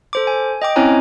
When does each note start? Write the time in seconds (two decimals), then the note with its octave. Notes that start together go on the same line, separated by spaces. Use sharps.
0.13 A4 C5 D6
0.27 G#5
0.62 D#5 G5 D6
0.76 C4 C#4 E4 C#5 G#5 A#5